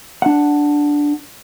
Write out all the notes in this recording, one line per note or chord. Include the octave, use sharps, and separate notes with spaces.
D4 F#5